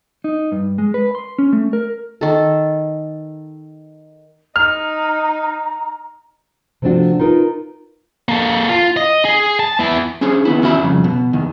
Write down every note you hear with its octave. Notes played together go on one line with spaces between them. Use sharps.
D#4
G2
G#3
B4
C6
C#4
A3
A#4
D#3 A4
D#4 A#5 F6
C3 F3 A3 C4 D4 F#4
D#4 F4 A#4 B4
A#3 A4
F4
D#5
G#4
A5
B3 E4
C#4 D4 G#4 C5 C#5
D#3 B3 E4
E2 C#4 F#4 E5 B5
C2 F2 C#3
B2
E2 D#3